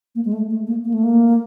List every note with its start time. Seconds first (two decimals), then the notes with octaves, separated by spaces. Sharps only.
0.15 A#3
0.25 G#3
0.33 A3
0.50 A3
0.67 A#3
0.85 A#3
0.94 A3
1.04 A#3